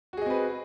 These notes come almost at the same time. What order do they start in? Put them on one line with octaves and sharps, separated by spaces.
F#4 G#4 D#5 C4 B4